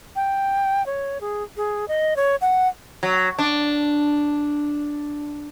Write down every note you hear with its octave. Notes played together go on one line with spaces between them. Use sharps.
G5
C#5
G#4
G#4
D#5
C#5
F#5
F#3
D4